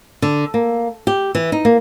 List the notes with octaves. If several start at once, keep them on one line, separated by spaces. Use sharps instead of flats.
D3
A#3
G4
E3
D#4
A#3